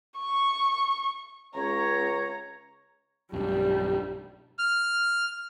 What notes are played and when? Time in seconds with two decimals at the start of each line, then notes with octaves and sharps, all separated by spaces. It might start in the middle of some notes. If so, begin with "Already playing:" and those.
0.18 C#6
1.55 C#2 C#5 A#5
3.33 B1 G2 G3
4.59 F6